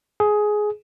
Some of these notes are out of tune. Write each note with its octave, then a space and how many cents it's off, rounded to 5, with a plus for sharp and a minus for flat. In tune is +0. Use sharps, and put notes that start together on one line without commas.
G#4 +15